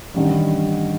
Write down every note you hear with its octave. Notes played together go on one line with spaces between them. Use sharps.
A1 G2 D#3